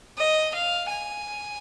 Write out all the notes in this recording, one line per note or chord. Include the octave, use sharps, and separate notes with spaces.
D#5
F5
G#5